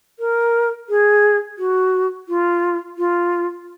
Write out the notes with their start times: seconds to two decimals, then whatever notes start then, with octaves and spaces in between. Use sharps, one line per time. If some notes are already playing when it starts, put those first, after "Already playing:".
0.19 A#4
0.89 G#4
1.58 F#4
2.28 F4
2.98 F4